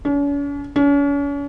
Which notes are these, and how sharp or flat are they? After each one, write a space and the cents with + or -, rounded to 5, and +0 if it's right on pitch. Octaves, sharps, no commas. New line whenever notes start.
C#4 +45
C#4 +40